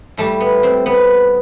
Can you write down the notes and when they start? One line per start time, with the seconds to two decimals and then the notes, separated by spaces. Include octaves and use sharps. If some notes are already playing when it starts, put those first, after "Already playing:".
0.17 A2 G3 A3
0.40 B3
0.63 C4
0.86 B3